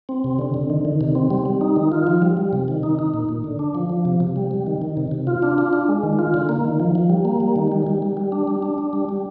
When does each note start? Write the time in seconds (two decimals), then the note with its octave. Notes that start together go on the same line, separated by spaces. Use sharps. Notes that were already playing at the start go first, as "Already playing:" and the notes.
0.09 C4
0.24 C3
0.39 D3
0.54 D3
0.70 D#3
0.85 D#3
1.01 C3
1.15 C4
1.31 G3
1.46 G3
1.61 D#4
1.76 D#3
1.92 F4
2.07 F3
2.22 G3
2.37 G3
2.53 C3
2.68 D#3
2.83 D#4
2.99 D#4
3.14 A#2
3.29 A#2
3.44 D3
3.59 D4
3.75 F3
3.90 F3
4.05 C3
4.20 C3
4.36 G3
4.51 G3
4.67 D#3
4.82 D#3
4.97 C3
5.11 C3
5.27 F4
5.42 D4
5.58 F4
5.73 D4
5.89 G#3
6.03 D#3
6.19 F4
6.34 D3
6.49 A#3
6.65 D#3
6.80 F3
6.95 F3
7.10 G3
7.25 A#3
7.40 G3
7.56 D#3
7.72 G3
7.87 G3
8.02 G3
8.17 G3
8.32 D4
8.48 G3
8.62 D4
8.78 D4
8.93 G3
9.09 G3